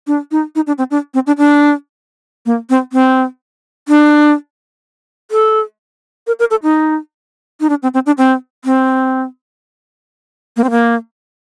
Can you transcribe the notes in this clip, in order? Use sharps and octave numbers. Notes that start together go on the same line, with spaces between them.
D4
D#4
D#4
D4
C4
D4
C4
D4
D4
A#3
C4
C4
D4
A4
A#4
A#4
A4
D#4
D#4
D4
C4
C4
D4
C4
C4
A#3
C4
A#3